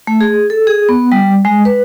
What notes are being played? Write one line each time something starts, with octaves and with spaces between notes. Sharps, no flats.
A3
G#4
A4
G#4
B3
G3
G#3
B4